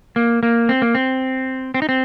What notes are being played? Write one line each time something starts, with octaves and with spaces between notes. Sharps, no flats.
A#3
A#3
C4
A#3
C4
C4
D#4
C4